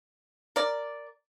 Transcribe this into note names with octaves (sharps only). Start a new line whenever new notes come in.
A#4 D5